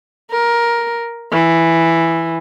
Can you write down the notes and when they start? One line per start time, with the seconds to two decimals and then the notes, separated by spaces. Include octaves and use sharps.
0.31 A#4
1.32 E3